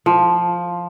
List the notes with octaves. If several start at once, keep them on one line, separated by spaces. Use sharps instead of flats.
F3